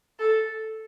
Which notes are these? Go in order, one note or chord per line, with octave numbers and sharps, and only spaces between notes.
A4